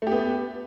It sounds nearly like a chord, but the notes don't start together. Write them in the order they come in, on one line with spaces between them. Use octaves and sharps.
A3 G4 B3